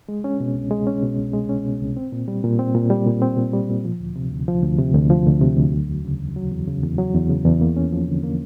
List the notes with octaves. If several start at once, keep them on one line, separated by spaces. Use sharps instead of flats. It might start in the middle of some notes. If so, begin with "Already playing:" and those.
G#3
C#4
B2
C2
G#3
C#4
B2
C2
G#3
C#4
B2
C2
C4
A#2
G3
A#2
C4
A#2
G3
A#2
C4
A#2
G3
A#2
F3
D2
C3
D2
F3
D2
C3
D2
F3
D2
C3
D2
F#3
E2
C#3
E2
F#3
E2
C#3
E2
F#3
E2
C#3
E2
A#3
C#4
F3
D3
A#3